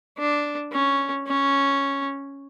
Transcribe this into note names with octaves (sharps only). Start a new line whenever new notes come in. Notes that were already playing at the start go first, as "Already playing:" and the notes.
D4
C#4
C#4